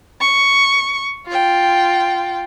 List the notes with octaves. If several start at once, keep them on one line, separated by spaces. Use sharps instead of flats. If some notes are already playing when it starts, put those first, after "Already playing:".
C#6
F4 G5